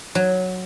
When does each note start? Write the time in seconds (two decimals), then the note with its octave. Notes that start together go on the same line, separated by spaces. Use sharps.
0.15 F#3